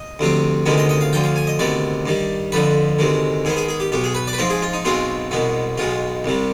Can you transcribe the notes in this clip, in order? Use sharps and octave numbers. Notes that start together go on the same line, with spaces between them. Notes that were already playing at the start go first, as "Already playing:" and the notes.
Already playing: D#5
D2 C3 F3 C4
D2 C3 D#3 G#3 B3
D#5
D#5
F5
D2 D3 F3 G5
F5
G#5
D#5
D2 C3 D#3 B3 D5
G2 D#3 G3
F2 D3 F3 B4
D2 C3 D#3 G#3
G#2 D#3 B3 G#4
G#4
G#4
G4
B1 B2 B3 G4
G#4
B4
D5
B4
G#2 F3 G#3 C4 C5
G#4
F4
D#4
B1 B2 G#3 C4 F4
C2 B2 G#3 B3
B1 B2 G#3 F4
C2 C3 G3